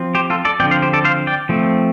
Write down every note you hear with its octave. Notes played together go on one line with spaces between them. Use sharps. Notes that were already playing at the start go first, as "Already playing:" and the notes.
Already playing: F3 C4
G4 C5
F4 A4
A4 D5
D3 F3 C4 D5 G5
C5 F5
G4 C5
A4 D5
C5 F5
D5 G5
F3 A3 C4